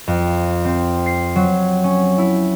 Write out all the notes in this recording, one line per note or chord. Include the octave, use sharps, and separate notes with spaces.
F2
C4
C7
F#3
C#4
E4